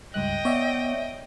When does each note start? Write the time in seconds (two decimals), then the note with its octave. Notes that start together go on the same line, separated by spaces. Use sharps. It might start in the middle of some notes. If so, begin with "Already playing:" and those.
0.14 C#2 G2 D#5 G5 F#6
0.45 B3 C#5 D5 E5